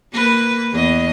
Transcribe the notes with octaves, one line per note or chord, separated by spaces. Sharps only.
A#3 B4
E2 D#5